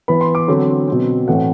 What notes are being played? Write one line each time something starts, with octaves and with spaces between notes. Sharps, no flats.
E3 B3 B5
C6
D6
D3 F#3 C4
B2 F#3 C4
A2 E3 A3 C4 F#5